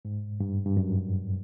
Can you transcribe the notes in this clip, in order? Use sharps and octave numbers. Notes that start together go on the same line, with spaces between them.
G#2
G2
G2
F#2